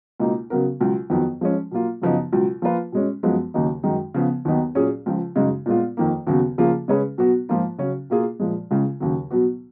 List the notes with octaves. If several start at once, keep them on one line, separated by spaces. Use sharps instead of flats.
C#2 B2 A#3 D#4
C#3 F#3 B3 F#4 A#4
C#2 B2 F#3
F2 D#3 F#3 B3
F3 G#3 C#4
B2 F#3 A#3 F4
F#2 C#3 F3 B3 D#4
C#2 B2 F#3
F3 A#3 F4 B4
B2 G#3 C#4
F#2 F3 G#3 B3
D#2 C#3 F#3 A#3 D#4
F#2 D#3 G#3 D#4
C#3 F3 B3
D#2 D#3 F#3 B3 D#4
A#2 F#3 C#4 G#4
C#2 C#3 F3
F#2 C#3 G#3 D#4
A#2 G#3 B3 F4
F2 D#3 A#3
D#2 C#3 F#3 B3 F#4
C#3 F3 A#3 F4 G#4
C#3 G#3 C#4 G#4 B4
B2 F#3 B3 F#4
G#2 F3 A#3 F4
C#3 F#3 C#4
B2 A#3 F4 G#4
A#2 F3 G#3
C#2 C#3 G#3
D#2 C#3 F#3
B2 F#3 B3 F#4